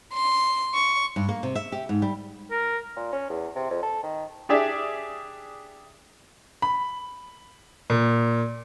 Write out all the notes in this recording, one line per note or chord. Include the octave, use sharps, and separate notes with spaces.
C6
C#6
G2
A#3
C3
E5
G4
G#2
G3
A#4
A#2
C#4
E2
C3
F2
A4
D#3
D4 G4 G#4 D5 E5
B5
A#2